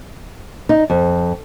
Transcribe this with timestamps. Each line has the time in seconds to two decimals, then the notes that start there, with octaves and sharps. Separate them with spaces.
0.69 D#4
0.90 F2